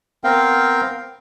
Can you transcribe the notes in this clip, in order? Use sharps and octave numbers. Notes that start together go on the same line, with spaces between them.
B3 C4 A#4 F5 G5